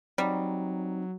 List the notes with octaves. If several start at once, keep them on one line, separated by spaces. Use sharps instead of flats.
F#3 G3 C4 D#4